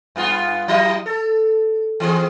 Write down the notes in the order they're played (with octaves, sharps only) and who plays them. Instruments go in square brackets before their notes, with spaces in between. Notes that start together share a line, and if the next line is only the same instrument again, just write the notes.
[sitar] G2 B3 F4
F#3 E4 D#5
A4
E3 C4 G#4